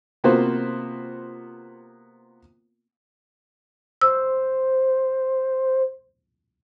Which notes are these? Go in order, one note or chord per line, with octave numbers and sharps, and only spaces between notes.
C3 A#3 B3 F4 F#4 C5
C5 E6